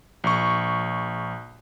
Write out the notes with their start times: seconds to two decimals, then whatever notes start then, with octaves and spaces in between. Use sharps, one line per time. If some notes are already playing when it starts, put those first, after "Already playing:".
0.24 A#1 C#6